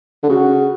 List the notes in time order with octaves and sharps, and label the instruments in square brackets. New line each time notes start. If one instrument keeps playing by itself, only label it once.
[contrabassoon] D3
[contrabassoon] C#3 [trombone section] F#4